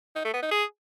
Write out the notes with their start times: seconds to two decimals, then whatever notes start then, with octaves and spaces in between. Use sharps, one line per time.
0.16 D#4
0.25 A3
0.34 B3
0.43 D#4
0.51 G#4